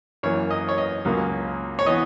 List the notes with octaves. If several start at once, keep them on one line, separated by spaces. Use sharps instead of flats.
F#2 E3 A#3 C#5
D#5
C#5
D#5
C#2 C#3 F#3 A#3
C#5
E3 B3 D#5